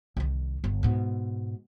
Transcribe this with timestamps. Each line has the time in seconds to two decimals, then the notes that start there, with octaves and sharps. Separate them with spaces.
0.17 C2 D#3
0.64 G1
0.83 G#2 B2